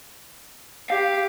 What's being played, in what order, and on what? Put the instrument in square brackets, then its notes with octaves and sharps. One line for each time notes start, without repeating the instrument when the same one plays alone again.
[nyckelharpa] G4 [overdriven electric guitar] F5